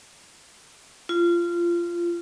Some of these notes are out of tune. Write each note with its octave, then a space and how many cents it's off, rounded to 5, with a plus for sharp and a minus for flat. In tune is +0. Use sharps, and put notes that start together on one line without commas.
F4 -20